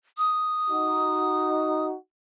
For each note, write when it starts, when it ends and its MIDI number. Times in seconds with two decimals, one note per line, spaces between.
0.18 1.86 87
0.70 1.94 63
0.70 1.94 66